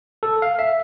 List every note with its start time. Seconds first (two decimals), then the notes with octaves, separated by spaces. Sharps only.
0.23 A4
0.42 F5
0.59 E5